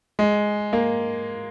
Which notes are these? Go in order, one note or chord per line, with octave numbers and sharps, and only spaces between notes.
G#3
A#3